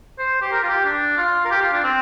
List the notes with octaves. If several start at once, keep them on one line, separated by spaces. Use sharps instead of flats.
C5
G4
A#4
F4
G4
D4
F4
A#4
G4
F4
D4
C4